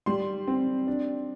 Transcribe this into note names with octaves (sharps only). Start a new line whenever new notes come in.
G3 C6
C4
D4